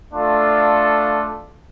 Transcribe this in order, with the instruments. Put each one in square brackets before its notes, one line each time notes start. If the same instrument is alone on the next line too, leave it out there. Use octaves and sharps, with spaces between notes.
[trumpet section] A3 D4 F4 A4